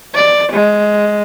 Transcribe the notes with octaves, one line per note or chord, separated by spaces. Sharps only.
D5
G#3